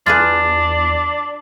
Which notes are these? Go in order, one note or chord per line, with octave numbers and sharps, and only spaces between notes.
E2 D4 F4 G#4 B4 A6